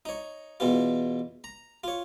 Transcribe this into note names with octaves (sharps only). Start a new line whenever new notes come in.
D#4 C#5
E2 B2 E3 F4
A#5
F4 C#5